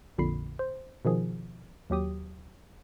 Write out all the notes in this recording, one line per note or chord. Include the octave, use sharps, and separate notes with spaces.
A#1 F2 A#2 D3 B5 C7
C5
B2 D#3 F3 G#4
D#2 F#3 G4 D#6